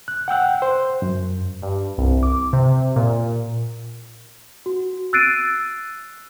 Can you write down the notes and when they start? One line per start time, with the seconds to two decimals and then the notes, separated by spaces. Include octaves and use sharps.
0.08 F#6
0.28 F#5 G5 E6 F#6
0.62 C5
1.02 F#2
1.62 G2
1.98 C2
2.23 D6
2.53 C3
2.96 A#2
4.66 F#4
5.13 E6 F#6 A6 C7 D7 D#7